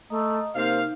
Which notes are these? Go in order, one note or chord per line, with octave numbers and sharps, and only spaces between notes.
A3 D#5 A#5 D#6
C3 A#3 D#4 C5 F5